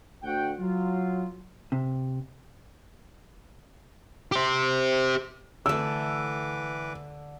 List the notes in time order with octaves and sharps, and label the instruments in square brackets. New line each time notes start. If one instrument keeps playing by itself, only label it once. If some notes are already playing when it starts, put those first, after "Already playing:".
[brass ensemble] D2 F#4 F#5 G5
F#3 F4
[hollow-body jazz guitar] C3
[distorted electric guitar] G4 C5
[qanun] D3 A3 [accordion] E3 B4 D6 [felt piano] E6